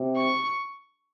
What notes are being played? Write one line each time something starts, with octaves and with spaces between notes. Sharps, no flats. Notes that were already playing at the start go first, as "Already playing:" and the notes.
Already playing: C3
C#6